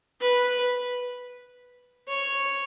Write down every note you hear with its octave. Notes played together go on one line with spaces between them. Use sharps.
B4
C#5